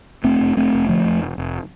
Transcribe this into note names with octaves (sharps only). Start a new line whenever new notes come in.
F1 A3 C4
F1
F1 A3 C4
F1
D3 F3 A3
F2
F1
F1